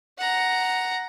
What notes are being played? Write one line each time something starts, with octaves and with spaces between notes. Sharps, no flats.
F#5 A#5